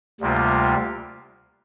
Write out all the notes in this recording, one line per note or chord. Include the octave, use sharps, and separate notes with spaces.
D2 C3 G3 A#3 F4